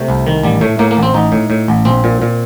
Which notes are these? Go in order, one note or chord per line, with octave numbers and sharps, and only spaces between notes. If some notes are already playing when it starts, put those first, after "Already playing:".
Already playing: C3 A3
C2
D#3
A1 G3
A2 A3
A2 A#3
A#3
A1
C4
A1 D#4
A2
A2
A1
A#1 C4
A#2
A#2